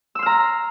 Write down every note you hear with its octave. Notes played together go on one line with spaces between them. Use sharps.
A#5 C6 E6 F6